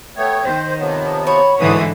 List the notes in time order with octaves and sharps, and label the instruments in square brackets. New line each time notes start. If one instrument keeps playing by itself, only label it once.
[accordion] A3 B3 C#5 [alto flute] G5
[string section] D#3 [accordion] C5
[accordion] C3 F3 B3 [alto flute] C#5
[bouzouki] F#4 C#5 [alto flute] B5
[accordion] D2 D#6 [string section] G#2 D3 E3 [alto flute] B4